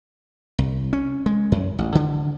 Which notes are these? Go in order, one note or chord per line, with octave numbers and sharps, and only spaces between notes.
C2
C#4
G#3
F#2
A1
D3